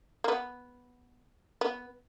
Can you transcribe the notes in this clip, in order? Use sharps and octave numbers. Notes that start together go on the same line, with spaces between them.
A#3
B3
B3